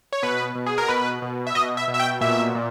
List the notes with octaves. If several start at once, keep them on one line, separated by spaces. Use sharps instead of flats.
C#5
B2 B4
B2
G#4
A#4
B2 B4
B2
E5
B2 D#5
E5
B2
E5
G5
A#2 E5
A#2